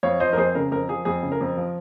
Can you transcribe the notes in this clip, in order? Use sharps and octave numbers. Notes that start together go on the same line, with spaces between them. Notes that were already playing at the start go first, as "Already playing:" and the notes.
F2 C#5 F5
F3 C5 D#5
A#4
F2 G#4 C5
C#3 A#4
F2 A#4
F3 G#4
F2 G#4
C#3
A#4
F2
F3